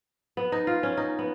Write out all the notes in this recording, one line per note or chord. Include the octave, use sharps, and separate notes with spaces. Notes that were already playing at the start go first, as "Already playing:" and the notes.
B3
D#4
F4
C#4
D#4
B3